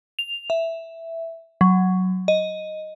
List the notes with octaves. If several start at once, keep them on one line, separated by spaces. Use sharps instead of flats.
F7
E5
F#3
D#5